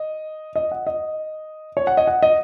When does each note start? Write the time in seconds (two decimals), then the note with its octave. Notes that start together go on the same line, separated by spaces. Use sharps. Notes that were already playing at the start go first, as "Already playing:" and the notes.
Already playing: D#5
0.56 D#5
0.71 F#5
0.87 D#5
1.77 C#5
1.87 F#5
1.97 D#5
2.07 F#5
2.23 D#5